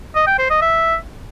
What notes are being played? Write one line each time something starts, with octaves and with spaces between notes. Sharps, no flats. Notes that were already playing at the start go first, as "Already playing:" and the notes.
D#5
G5
C5
D#5
E5